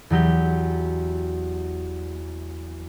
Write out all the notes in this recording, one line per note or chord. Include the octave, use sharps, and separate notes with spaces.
E2 F#3 G4 G6